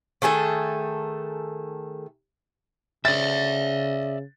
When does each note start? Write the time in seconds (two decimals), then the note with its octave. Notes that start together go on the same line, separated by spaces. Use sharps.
0.22 D#3 A3 G#4 A4
3.05 C#3 D5 E5 A6